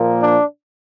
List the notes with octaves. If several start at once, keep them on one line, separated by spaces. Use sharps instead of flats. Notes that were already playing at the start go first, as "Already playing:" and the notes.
Already playing: A#2 F3 A#3
D4